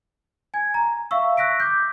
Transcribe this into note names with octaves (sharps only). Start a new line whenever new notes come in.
G#5 G#6
A#5
E5 F5 C#6 E6
E6 F#6 A#6 B6 D7
D6 G6